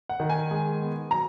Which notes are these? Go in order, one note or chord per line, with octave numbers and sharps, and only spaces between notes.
F#5
D#3
G#5
G#3
B3
F#3 A#5